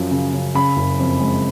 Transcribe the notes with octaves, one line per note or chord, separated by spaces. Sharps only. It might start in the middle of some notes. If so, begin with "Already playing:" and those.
Already playing: F#2 F3
C#3
C#3
C#3 B5
F#1
F2
G#3